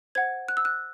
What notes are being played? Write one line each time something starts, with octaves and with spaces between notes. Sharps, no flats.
C5 F#5 G#6
F#6
E6
F#6